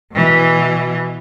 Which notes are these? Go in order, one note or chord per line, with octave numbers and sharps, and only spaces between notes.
B2 E3